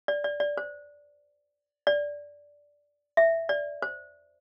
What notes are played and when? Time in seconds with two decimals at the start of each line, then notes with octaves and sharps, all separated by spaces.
0.08 D5
0.24 D5
0.40 D5
0.57 C5
1.87 D5
3.17 E5
3.49 D5
3.82 C5